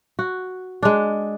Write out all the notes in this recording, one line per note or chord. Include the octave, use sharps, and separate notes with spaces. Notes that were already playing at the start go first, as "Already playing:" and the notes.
F#4
G#3 D4